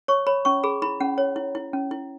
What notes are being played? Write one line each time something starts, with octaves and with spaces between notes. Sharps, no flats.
C#5 C#6
C#5 B5
C#4 C#6
G#4 B5
E4 B5
C#4 F#5
C#5
E4
E4
C#4
E4